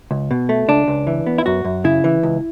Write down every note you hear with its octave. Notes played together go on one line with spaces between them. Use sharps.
C#2
B2
A3
C#2 D4
C#2
E3
B3
E4
F#2 F#4
F#2
C#3 E4
E3
C#2